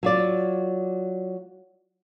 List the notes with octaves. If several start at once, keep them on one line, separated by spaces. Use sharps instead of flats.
F#3 F4 D5